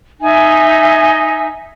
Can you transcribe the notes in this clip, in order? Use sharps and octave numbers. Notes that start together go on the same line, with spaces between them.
D#4 E5 G#5